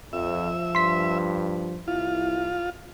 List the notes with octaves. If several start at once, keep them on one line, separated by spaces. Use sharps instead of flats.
F2 F3 E5
G2 C6 B6
C2 E4 F4